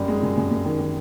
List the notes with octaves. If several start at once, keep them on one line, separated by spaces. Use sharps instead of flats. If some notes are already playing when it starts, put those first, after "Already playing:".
Already playing: F#2 G3
G#3
F#2
F#2
F#2
D#3
D#3